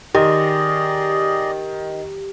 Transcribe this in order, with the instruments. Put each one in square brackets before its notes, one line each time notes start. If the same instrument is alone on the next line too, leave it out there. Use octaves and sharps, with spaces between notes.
[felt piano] D#3 [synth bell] G4 [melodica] G#4 D5 D#5